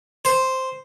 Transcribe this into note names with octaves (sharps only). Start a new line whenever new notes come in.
C5